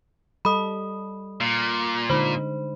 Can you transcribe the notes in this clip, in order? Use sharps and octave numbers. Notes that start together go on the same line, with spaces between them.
G3 A4 D#5 B5 D#6
A#2
D3 G#3 D#4 C5 B5